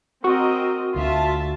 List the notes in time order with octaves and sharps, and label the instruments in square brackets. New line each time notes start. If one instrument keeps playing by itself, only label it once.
[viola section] C4 A#4 D#5 [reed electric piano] F#4 C#6
[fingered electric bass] D2 [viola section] F4 E5 A5